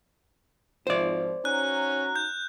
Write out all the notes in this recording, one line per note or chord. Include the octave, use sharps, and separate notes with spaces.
G#1 G#2 F3 C5 D5
C#4 D#4 F#4 A#5 F#6
G6